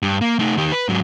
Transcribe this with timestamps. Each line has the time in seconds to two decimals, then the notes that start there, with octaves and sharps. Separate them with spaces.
0.02 G2
0.21 A#3
0.39 A3 D#4
0.58 D#3 G4
0.72 B4
0.89 G#2 F#3